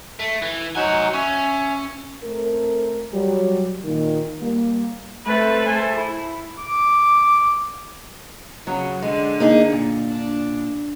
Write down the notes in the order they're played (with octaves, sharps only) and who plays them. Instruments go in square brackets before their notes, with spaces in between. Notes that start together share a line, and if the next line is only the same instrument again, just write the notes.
[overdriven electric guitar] A3
E3
[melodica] F#3 D#4 F#5 [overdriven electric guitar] C5 G#5
[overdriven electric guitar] C#4 [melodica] E5 G#5
[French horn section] A3 C4 A4 A#4
F#3 G3
A#2 D#3
G3 A#3
[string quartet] A3 C4 A4 B4
A3 A4 C5 G#5
E4
[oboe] D6
[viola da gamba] C#3 [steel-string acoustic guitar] F#3
[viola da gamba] D3 [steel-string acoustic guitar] G#3
[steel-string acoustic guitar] A#3 D#4 G#4
A#2
[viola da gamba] D4